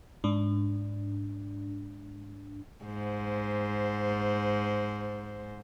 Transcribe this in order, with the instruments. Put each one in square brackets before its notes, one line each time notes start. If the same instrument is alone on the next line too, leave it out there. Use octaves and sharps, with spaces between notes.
[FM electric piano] G#2 D4
[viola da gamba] G#2 C5